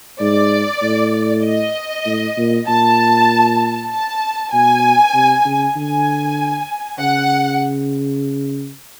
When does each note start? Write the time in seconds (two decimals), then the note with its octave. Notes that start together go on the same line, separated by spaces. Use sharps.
0.21 G#2 D5
0.82 A2
1.44 D#5
2.06 A2
2.37 A#2
2.68 A#2 A5
3.91 A5
4.53 B2 G#5
5.14 C3
5.45 C#3
5.76 D3 G#5
6.99 C#3 F#5